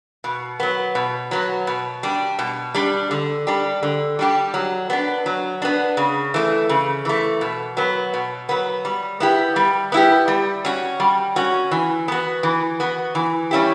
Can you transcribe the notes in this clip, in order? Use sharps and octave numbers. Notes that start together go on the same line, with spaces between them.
B2
F#3 B3
B2
F#3 B3
B2
G3 D4
B2
G3 D4
D3
G3 D4 G4
D3
G3 D4 G4
F#3
B3 D4
F#3
B3 D4
C#3
E3 A3
C#3
E3 A3
B2
F#3 B3
B2
F#3 B3
G3
B3 E4 G4
G3
B3 E4 G4
G3
C#4 F#4
G3
C#4 F#4
E3
B3 F#4
E3
B3 F#4
E3
G3 C#4 E4 G4